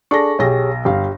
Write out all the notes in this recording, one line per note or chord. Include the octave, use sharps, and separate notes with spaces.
D4 G#4 A4 C#6 A#6
B1 G4 G#4 C#5 A#6
G1 G4 F5